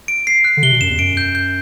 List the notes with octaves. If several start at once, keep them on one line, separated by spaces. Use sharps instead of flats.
D7
C7
F#6
D3
C3 G7
B2
F#2 E7
E2
F#2 D7
G6
G6